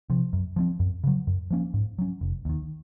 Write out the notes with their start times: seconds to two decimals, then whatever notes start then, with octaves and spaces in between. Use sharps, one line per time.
0.10 C3 F3
0.33 F#2
0.56 F3 G#3 C4
0.80 F#2
1.04 C#3 F#3
1.27 F#2
1.51 F3 A#3 C#4
1.74 G#2
1.99 F#3 C#4
2.21 F1
2.45 D#2 D#3